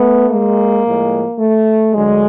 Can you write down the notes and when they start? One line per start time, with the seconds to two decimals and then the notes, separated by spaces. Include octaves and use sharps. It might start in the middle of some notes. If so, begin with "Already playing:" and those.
Already playing: A3 B3
0.30 G#3 A#3
0.85 A2 F3 G#3
1.39 A3
1.93 D2 D3 F#3 G#3